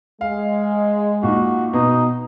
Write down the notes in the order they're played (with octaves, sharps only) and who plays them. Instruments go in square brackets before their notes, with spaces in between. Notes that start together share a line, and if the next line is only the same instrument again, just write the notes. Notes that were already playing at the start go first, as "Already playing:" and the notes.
[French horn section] G#3 [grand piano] F5
[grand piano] A#2 D#4 [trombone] F#4
[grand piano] B2 [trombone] D#4